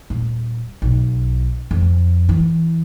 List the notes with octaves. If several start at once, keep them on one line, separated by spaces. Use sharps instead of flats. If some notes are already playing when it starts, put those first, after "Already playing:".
D#1
B1
F2
E2 E3